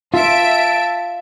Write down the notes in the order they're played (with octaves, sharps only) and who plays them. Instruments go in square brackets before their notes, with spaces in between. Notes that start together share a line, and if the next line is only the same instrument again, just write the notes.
[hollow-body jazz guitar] F4 [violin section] E5 D7 [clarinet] A5